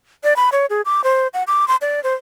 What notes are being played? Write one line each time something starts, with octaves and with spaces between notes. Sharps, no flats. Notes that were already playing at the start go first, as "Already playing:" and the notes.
D5
B5
C#5
G#4
D6
C5
F#5
D6
C6
D5
C5